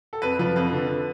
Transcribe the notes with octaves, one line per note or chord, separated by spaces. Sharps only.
A4
F2 B4
F3 B4
F2 B4
D3